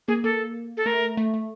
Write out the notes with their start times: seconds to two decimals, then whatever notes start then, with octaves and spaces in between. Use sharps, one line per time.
0.08 A#3 G#4
0.24 A#3 A4
0.77 A4
0.86 A3 A#4
1.17 A3
1.34 A3